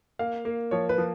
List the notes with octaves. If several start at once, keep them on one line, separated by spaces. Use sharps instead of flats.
A#3 F5
A#3
F3 C#5
B4
F3